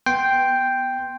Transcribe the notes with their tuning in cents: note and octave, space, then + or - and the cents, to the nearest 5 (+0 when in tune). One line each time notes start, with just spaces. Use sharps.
B3 +0 G5 +0 C6 +0